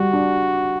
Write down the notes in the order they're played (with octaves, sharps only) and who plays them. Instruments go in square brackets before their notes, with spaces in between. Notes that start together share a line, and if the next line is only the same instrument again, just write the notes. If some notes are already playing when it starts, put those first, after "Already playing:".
Already playing: [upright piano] G3 [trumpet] F#4
[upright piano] D4